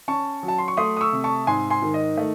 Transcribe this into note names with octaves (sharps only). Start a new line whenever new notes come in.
C#4 A5 C#6
F#3
A5
C6
C#6
A3 C6 D#6
D#6
C#6 E6
C3
A5 C#6
G#2 G#5 C6
G#5 C6
D#3
D#5
A3